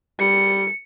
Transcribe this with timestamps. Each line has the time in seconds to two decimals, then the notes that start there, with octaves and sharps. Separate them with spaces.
0.20 G3 C#7